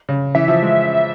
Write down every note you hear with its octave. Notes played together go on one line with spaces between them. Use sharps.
C#3
E3 E5
F3
G#3